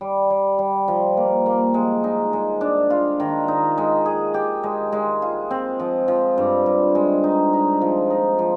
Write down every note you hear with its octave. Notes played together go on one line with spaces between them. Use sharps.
G3
G3
G3
F3
A#3
A#3
G#3
D#4
G#3
D4
F4
D#3
D#4
G#3
G#4
G4
G#3
G#3
F4
C4
F3
F3
G2
G2
G#3
D#4
D#4
F3
D#4
F3